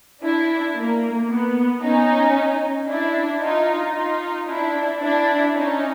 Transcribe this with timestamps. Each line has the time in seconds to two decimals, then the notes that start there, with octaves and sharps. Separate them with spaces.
0.23 D4 E4
0.76 A#3
1.30 B3
1.82 C#4 D#4
2.88 D4 E4
3.42 D#4 F4
3.95 D#4 F4
4.48 D4 E4
5.01 D4 E4
5.55 C#4 D#4